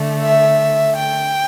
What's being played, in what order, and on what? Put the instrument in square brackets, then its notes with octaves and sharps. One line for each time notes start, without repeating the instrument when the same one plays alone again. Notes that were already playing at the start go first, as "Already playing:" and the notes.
Already playing: [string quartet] D3 A3
E5
G5